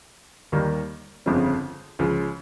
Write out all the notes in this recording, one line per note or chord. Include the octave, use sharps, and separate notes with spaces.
D#2 D#3 G3 A#3
G1 F2 C#3 F3 C4
C#2 C#3 F3